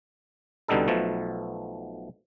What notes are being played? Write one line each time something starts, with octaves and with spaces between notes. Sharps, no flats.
C2 B2 D3 G3 D#4 A4
B1 B2 F3 A3